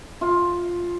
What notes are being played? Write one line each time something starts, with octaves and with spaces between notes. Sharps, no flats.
F4